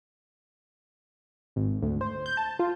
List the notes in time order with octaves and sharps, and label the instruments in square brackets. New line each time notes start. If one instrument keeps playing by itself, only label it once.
[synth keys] G#1
D2
C5
G6
A5
F4